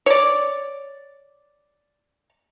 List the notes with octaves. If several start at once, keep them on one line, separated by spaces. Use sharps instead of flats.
C#5 D5